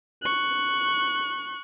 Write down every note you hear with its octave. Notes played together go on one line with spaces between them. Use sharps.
C#6 F#6